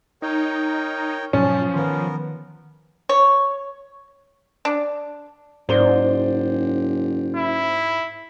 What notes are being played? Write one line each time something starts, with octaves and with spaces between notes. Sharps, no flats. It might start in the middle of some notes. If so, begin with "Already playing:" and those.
D#4 A#4 C#5 G5
G#2 B2 F3 F#3 C#4 A5
D#3 B3 A#4
C#5
D4
F#1 G#2 C5 D5 G7
E4